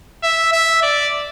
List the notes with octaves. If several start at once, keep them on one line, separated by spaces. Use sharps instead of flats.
E5
E5
D5